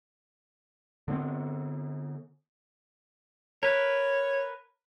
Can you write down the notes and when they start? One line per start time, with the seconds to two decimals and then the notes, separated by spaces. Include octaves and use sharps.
1.08 D3 B3 C4
3.63 A#4 B4 C#5